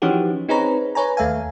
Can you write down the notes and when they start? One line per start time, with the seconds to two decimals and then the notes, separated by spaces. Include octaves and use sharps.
0.02 E3 F3 C#4 D#4 F#4 G4
0.49 C4 D#4 G#4 B4 C#5 A#5
0.95 B4 C#5 G#5 A#5
1.17 D#2 A3 E5 F5 G#5